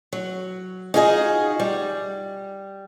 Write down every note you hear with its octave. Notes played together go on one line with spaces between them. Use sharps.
F#3
D#4 F4 F#4 G#4 C5 D#5
G3